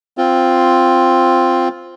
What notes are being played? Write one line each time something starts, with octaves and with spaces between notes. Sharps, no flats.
C4 F4